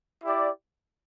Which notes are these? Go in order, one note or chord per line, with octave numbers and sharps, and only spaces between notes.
E4 G4 D5